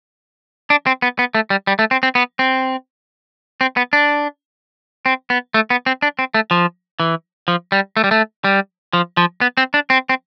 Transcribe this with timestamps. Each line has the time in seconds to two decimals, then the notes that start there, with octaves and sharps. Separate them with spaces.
0.70 D4
0.86 C4
1.02 B3
1.19 B3
1.35 A3
1.50 G3
1.67 G3
1.79 A3
1.91 C4
2.03 C4
2.15 B3
2.39 C4
3.61 C4
3.77 B3
3.93 D4
5.06 C4
5.30 B3
5.54 A3
5.70 B3
5.86 C4
6.02 D4
6.19 C4
6.34 A3
6.51 F3
7.00 E3
7.48 F3
7.72 G3
7.97 A3
8.04 G3
8.11 A3
8.44 G3
8.93 F3
9.17 F3
9.41 B3
9.57 C4
9.74 D4
9.90 C4
10.09 C4